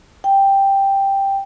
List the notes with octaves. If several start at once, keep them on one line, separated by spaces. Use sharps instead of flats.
G5